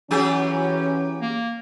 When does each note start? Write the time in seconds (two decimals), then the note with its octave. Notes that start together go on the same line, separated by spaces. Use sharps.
0.11 E3 F#3 C#4 G4 G#4
1.21 A#3